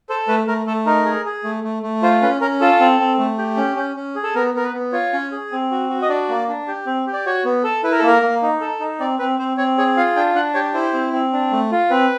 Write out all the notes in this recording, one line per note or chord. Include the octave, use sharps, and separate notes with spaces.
A4 C5
A3 B4
A3 A#4
A3 A4
D#4 A#4
G#4
G#4
A3
A3
A3
F4 C5
C#4 B4
C#4 A#4
F4 A4
C4
C4
A3
G4
C#4
C#4
C#4
G#4
A4
B3 A#4
B3 A#4
B4
B3
F4 C#5
C#4
G#4
C4
F#4
F#4
D#5
D4 D5
A#3
D4
G4
C4
G4
D5
F#4 C#5
B3
A4
E4 B4
A#4
A4
A#3 A#4
A#3
D#4
A4
D#4
C4 D5
C4 B4
C4 C5
C4 C#5
G#4 C#5
F4 F5
D4 G5
D4 F#5
G4 C#5
E4 C5
C4
C4
D4
A3
F4
C4 B4